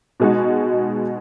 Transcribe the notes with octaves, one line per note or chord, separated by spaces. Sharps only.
B2 G#3 D#4 F#4